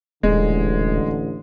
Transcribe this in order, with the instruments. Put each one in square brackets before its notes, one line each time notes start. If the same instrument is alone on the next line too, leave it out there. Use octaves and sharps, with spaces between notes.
[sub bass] D#1 [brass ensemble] A1 D3 [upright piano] G#3